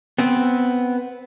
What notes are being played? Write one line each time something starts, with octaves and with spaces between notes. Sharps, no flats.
B3 C4